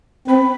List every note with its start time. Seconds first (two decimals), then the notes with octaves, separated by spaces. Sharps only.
0.28 C4 B5